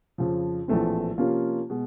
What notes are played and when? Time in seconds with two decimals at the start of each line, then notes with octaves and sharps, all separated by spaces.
0.18 F2 C#3 F3
0.68 A#1 A2 E3 A3 C4
1.18 C3 F3 A#3 C#4 F4
1.70 B2 G#3